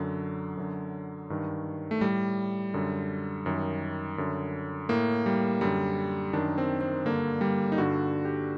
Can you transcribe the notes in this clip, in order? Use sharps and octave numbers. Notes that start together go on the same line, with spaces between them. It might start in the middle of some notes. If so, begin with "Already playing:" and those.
Already playing: F#2 D3 F#3
F#2 D3
G2 D#3
A3
A2 G3
F#2 D3
F#2 D#3
F#2 D3
A2 A#3
G3
F#2 D3 G3
F#2 D#3 D4
C4
C4
G2 D3 A#3
G3
D#4
G2 D3 F#4
G4